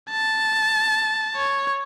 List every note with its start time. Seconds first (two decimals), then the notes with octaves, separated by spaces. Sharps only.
0.11 A5
1.36 C#5